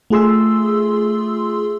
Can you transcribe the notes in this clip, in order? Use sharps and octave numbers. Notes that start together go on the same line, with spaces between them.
A3 F4 G#4 C6 E6